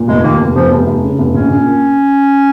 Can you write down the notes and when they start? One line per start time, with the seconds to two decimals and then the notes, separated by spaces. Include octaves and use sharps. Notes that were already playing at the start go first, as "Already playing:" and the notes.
Already playing: A#2
0.08 F1 G#3
0.23 D#2 A#3
0.40 F1
0.55 F1 F3
0.71 F1
0.87 F1
1.03 C#3
1.18 F1
1.34 A#1 C#4
1.50 A#2
1.66 A#3